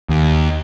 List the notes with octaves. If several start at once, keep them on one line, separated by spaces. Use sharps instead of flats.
D#2